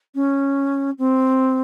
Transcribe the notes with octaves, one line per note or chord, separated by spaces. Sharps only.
C#4
C4